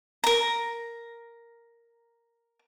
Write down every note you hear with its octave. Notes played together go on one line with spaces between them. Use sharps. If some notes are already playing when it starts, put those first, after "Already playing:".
A#4 A#5